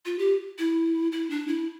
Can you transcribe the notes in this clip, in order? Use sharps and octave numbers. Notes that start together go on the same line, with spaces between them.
F4
G4
E4
E4
D4
E4